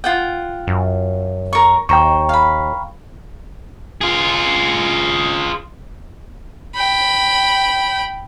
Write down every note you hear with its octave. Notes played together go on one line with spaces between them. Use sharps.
F4 F#5 G5
F#2
A#4 C#6
D#2 C5 G5 A#5 C#6
F5 B5
F4 G#4
G5 B5